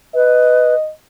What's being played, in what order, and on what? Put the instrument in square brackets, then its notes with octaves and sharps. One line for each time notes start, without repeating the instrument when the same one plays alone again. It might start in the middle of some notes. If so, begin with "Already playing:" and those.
[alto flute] B4 [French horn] D#5